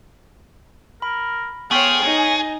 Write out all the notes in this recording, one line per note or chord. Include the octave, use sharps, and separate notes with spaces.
A#4 B5
B3 F4 G#4 C#5 G5 C#6 B6
D#4 C#5 G#5